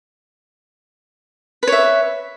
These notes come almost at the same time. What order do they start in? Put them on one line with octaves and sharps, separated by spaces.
B4 C#5 E5